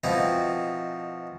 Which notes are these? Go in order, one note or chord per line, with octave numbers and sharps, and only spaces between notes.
B2 F3 C4 D#4 E4